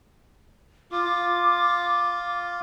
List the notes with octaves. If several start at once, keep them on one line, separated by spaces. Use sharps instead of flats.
F4 D6